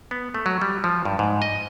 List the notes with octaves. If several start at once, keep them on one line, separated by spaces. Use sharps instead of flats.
B3
A3
F#3
G3
F3
G2
G#2
D#5